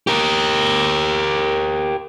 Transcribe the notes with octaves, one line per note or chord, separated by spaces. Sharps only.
G4 A#4